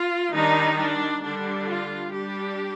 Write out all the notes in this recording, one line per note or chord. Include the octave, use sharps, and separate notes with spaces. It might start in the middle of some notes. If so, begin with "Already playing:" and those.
Already playing: F4
D#3 G3 D4 D#4
D4
D3 G3 D4
F4
G3 D4 G4